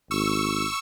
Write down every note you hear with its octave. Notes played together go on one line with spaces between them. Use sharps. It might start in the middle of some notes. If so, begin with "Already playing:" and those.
G#1 C#6 E6